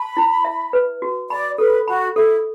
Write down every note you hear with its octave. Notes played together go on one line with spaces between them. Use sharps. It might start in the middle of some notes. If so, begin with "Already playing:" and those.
Already playing: A5 B5
E4
E5
B4
F#4
D5 B5
A4 B4
F#4 B5
E4 A4